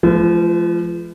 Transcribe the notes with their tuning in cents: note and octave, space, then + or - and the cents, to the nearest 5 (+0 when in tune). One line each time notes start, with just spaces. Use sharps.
F3 -25 G#3 +45 B4 +25